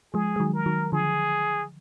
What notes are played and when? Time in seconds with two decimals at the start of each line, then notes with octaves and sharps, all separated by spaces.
0.14 F3 G#3 G#4
0.36 G#3
0.40 D#3 F#3
0.54 A#4
0.66 D#3 F#3
0.92 D3 F3 G#4